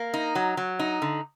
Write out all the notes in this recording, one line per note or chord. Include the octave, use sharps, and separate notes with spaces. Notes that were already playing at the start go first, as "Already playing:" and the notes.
Already playing: A#3
D#4
F#3
F#3
D#4
D3